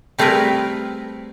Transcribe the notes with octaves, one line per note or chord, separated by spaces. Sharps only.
G3 A3 C4 G#4 A#4 B4